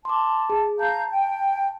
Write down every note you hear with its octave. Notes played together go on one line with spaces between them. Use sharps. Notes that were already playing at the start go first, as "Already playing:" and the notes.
A5 C6 D6
G#4
F5 A5 A#5 G6
G5